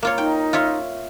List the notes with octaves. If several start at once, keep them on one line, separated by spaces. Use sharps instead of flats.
A#3 F4 C#5
D#4 G5
F4 C#5 E5